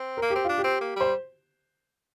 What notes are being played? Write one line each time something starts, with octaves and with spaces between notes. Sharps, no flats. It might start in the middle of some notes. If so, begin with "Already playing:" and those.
Already playing: C4
A#3 A#4
C4 G4
D4 F4
G4
C4
A#3
G3 C5